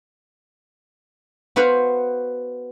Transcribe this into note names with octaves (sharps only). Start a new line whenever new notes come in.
B3 F#4 B4 C5 F5 F#5